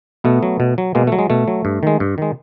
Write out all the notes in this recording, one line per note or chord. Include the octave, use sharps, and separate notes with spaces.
B2 A3 B3
F#3
B2
F#3
B2 G#3 A#3
A3
F#3
G#3
B2 A3
F#3
G2
D#3 G#3
G2
D#3 G#3